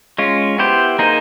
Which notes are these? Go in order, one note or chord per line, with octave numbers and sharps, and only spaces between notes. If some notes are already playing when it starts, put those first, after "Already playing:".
G#3 C#4 F4
B3 E4 G4 C5
A#3 D#4 G#4 C5